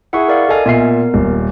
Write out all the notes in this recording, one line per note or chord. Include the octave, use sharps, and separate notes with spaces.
E4 G#4 F#5 C#6
A#4 D5 F5
A4 D#5 F5 G#5
A#2 B3 A#4 E5 C7
D#1